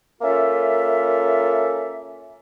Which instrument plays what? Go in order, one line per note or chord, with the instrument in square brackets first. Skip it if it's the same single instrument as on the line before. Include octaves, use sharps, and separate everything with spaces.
[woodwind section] A#3 C#4 F4 A4 E5